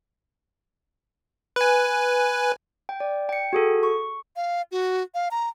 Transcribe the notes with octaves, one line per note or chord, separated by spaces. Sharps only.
B4 G#5
G5
D5
G5 C#7
F#4 G#4 A4
C#6
F5
F#4
F5
A#5